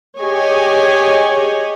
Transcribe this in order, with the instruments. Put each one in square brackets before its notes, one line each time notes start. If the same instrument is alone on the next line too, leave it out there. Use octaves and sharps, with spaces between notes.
[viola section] G4 G#4 C#5 D#5 G#5